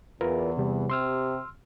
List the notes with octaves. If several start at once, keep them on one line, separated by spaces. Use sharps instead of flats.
E2 F4 A#4 B4
C3 G3
C3 G4 C6 E6 F6